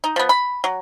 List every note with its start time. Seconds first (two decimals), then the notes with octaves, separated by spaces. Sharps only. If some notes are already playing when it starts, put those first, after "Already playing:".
0.04 D#4
0.16 F3 B3
0.29 B5
0.64 F#3